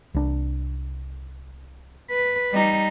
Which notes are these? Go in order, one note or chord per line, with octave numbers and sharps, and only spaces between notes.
C2 D4
B4
G3 D#4